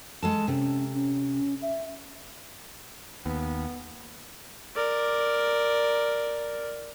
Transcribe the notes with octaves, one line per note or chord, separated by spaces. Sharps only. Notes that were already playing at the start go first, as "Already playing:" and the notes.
G#3 A4 A5
C3 C#4
C#4
E5
D#2 B3
A#4 D5